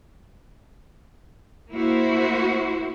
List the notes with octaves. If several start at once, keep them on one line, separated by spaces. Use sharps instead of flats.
A#3 E4 F#4 C5